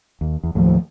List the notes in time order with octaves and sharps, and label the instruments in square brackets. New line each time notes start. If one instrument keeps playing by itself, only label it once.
[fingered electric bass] D#2
E2
[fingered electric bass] D#2 A2 [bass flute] F3